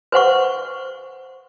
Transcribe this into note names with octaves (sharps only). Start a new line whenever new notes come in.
B4 C5 F#5 C#6